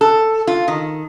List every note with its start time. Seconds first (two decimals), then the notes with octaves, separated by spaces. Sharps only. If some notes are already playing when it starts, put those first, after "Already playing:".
0.01 A4
0.47 F4
0.68 D#3